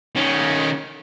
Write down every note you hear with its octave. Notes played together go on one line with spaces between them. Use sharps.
D#3 C#4